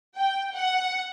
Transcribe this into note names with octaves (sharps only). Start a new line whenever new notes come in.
G5
F#5